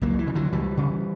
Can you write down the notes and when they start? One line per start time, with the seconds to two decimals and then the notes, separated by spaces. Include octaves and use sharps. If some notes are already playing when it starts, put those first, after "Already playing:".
0.02 C#2 F#3 A#3
0.19 E3
0.27 C#3
0.35 D3 F#3
0.52 C#2 E3 G3
0.77 C#3